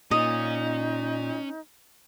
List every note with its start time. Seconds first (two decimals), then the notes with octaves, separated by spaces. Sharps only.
0.11 A#2 C#4 D#4 D#5